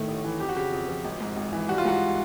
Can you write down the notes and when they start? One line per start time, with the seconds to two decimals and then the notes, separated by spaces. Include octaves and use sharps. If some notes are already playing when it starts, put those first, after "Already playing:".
Already playing: A2 D#3 A3
0.08 A1
0.25 E3
0.40 F2 G4
0.49 F#4
0.56 C#3 G4
0.72 F2
0.89 F3
1.04 G#1
1.21 G#2
1.37 G#1
1.53 E3
1.69 G3 F#4
1.78 F4
1.85 G#2 F#4